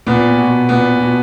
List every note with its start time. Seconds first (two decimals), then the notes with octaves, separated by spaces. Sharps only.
0.07 A#2 B3
0.38 B2
0.69 A#2 B3
1.01 B2